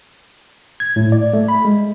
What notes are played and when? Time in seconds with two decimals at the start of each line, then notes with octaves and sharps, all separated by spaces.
0.80 G#6
0.96 A2
1.12 D5
1.33 A3
1.48 B5
1.65 G#3